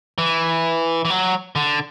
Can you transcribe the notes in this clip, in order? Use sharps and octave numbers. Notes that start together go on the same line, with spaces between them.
E3
E3
F#3
D3